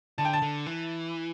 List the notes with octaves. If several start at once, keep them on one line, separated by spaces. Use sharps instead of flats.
D3 A5
G5
A5
D3
E3